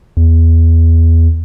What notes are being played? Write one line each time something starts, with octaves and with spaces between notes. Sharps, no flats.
E2